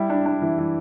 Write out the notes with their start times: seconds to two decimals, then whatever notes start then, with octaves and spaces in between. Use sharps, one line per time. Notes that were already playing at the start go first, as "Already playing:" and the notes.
Already playing: G3 E4
0.10 D4
0.26 D4
0.42 E3
0.58 E3